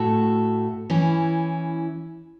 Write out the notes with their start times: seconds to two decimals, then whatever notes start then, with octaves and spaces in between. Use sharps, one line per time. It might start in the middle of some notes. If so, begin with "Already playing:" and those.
Already playing: A2 A3 F#4 A4
0.90 E3 C#4 E4